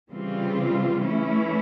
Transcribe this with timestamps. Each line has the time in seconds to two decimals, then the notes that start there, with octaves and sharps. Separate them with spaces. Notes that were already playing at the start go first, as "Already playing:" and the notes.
0.10 C#3 E3 G3 C4 F4
1.02 E3 A3 C#4 E4